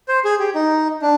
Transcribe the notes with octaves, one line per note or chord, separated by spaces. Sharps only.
C5
G#4
G4
D#4
D4